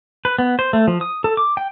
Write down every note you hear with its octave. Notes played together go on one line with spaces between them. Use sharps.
B4
B3
C5
A3
F3
D#6
A4
D6
G5